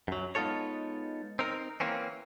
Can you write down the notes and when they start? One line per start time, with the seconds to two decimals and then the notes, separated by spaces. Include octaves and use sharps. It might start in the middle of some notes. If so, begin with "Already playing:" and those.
0.08 F#2 F#3
0.35 G#3 B3 D#4 F4 A4 C#5
1.39 C4 D#4 A#4
1.80 E3 A#3 C4 C#4